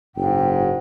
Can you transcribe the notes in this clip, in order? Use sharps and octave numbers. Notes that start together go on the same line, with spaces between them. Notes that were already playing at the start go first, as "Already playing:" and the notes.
F#1 G#2 G5